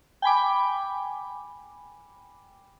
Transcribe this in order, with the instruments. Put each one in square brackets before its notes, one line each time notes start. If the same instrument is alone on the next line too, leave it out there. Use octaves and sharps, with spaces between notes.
[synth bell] G5 G#5 B5 D6